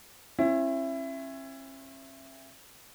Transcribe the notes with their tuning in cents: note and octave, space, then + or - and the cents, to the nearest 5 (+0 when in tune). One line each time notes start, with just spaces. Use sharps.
C#4 -45 E4 +20